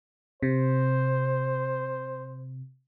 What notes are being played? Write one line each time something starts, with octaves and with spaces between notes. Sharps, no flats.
C3 C5